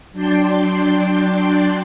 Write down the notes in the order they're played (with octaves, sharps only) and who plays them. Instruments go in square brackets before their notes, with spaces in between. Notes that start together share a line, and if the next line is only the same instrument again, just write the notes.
[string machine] F#3 D4 D5 G5 A5 C6